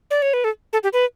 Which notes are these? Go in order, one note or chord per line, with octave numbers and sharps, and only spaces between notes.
D5
C#5
B4
A4
A4
G4
B4